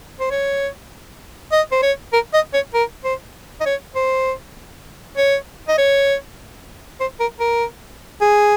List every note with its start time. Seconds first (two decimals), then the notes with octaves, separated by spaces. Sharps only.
0.20 C5
0.31 C#5
1.52 D#5
1.71 C5
1.83 C#5
2.13 A#4
2.34 D#5
2.53 C#5
2.74 A#4
3.05 C5
3.61 D#5
3.65 C#5
3.95 C5
5.17 C#5
5.68 D#5
5.78 C#5
7.00 C5
7.20 A#4
7.40 A#4
8.21 G#4